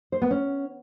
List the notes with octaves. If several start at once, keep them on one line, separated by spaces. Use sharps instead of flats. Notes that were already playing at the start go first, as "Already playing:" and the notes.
C5
B3
C#4